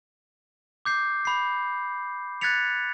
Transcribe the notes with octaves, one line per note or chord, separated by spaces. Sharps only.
D6 G6 C7
B5 C7
F#6 G#6 A6 B6 C#7 F7